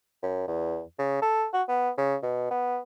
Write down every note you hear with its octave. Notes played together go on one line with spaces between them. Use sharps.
F#2
E2
C#3
A4
F#4
B3
C#3
B2
B3